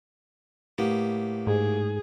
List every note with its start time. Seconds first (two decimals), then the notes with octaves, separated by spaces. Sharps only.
0.78 A2 A#3 B3 G4
1.47 G#2 G#4